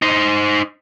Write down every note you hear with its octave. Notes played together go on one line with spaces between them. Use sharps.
D#4 C5